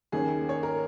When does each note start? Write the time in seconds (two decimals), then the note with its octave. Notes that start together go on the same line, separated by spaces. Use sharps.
0.12 D#2 D#3 A#3 C#4 G#4
0.49 C#5
0.63 A#4